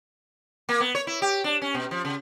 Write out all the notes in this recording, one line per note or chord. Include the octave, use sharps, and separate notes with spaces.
A#3
B3
C#5
E4
G4
D4
C#4
B2
F3
C#3